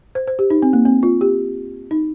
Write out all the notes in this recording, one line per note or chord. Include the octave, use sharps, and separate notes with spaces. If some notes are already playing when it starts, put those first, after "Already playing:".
C5
C5
G4
D#4
C4
A#3
C4
F4
G4
D#4